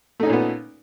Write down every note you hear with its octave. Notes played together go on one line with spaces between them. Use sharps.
A#2 A3 B3 C#4 D#4